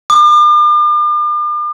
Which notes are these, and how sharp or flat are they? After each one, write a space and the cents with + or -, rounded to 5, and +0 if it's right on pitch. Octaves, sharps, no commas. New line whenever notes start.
D6 +40